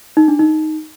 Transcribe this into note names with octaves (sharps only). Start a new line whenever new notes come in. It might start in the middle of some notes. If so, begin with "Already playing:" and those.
D#4
D4
D#4